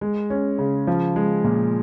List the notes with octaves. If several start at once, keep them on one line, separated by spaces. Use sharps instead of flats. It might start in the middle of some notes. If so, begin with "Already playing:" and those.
G#3
C#4
C#3
F3
G#3
A#2